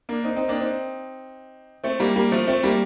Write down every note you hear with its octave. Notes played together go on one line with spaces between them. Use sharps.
A#3 D4
C4 D#4
C4 D#4
A#3 D4
C4 D#4
A3 C4
G3 A#3
G3 A#3
F3 A3
A3 C4
G3 A#3